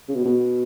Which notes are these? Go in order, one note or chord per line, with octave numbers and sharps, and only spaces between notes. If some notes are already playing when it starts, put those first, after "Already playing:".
C#3
B2
B2